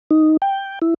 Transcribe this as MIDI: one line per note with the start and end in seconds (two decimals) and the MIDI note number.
0.11 0.37 63
0.42 0.79 79
0.82 0.94 64